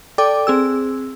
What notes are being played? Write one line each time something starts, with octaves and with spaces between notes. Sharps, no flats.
A4 D5 G5 D6
C4 G#4 E6